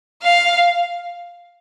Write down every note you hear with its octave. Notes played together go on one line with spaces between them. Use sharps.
F5